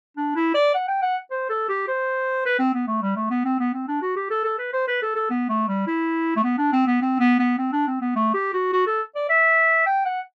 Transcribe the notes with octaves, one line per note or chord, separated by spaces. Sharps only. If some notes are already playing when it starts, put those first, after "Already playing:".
D4
E4
D5
F#5
G5
F#5
C5
A4
G4
C5
B4
C4
B3
A3
G3
A3
B3
C4
B3
C4
D4
F#4
G4
A4
A4
B4
C5
B4
A4
A4
B3
A3
G3
E4
A3
B3
D4
C4
B3
C4
B3
B3
C4
D4
C4
B3
A3
G4
F#4
F#4
A4
D5
E5
G5
F#5